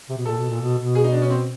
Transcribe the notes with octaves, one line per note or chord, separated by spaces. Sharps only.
C3
B2
A#2 A4
B2
A#2
B2
B2
G#4
D#4
D4
C#4
C4